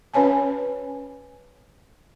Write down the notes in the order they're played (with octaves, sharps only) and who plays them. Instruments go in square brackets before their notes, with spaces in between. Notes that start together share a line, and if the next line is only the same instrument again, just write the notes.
[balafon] C#4 B4 C#5 G#5 A5